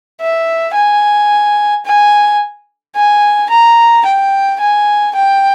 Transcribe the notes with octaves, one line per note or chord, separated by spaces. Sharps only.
E5
G#5
G#5
G#5
A#5
G5
G#5
G5